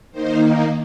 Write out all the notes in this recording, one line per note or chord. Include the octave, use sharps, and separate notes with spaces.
D#3 A#3 D#4 C5